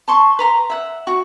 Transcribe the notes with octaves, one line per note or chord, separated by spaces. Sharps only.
A5 C6 C#6
B4 A#5 C6
E5 F#5
F#4 C#6